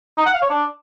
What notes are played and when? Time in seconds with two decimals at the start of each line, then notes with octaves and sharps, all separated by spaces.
0.18 D#4
0.26 F#5
0.34 F5
0.42 C#5
0.50 D4